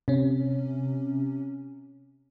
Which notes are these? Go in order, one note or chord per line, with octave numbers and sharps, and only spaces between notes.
C3 C#4